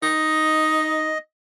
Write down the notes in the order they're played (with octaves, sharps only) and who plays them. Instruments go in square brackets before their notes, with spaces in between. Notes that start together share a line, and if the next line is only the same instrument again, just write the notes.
[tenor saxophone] D#4 [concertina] D#5